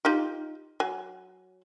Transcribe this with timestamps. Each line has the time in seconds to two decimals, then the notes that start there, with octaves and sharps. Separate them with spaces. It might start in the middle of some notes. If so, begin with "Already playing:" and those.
0.05 D#4 F4 G4
0.80 F#3 G#5